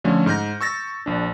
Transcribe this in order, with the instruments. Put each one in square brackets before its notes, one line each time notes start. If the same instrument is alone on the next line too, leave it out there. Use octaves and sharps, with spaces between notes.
[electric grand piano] D3 F3 A3 C#4
G#2 F6 G6 A#6
C#6 E6 A6 A#6
A#1 D4